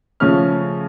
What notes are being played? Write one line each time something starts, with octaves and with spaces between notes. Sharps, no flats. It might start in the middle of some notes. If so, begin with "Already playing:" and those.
C#3 F3 A3 C#4 F6